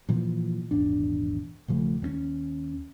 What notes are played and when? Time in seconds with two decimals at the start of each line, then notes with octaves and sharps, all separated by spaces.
0.09 A#2 E3 F3
0.71 D#1 G#1 E2 D4
1.68 D#1 C#3 F3 A3
2.02 D#2 A#3 C#4